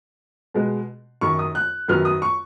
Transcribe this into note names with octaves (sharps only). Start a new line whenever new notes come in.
B2 G#3 B3
F#2 D#3 F#3 C#6
D#6
F#6
F#2 D#3 F#3 B3 F6
D#6
C#6